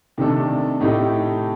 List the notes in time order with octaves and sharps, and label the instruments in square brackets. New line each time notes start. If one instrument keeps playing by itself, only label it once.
[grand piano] C3 D#3 A3 D4 A4
A2 A3 D#4 G4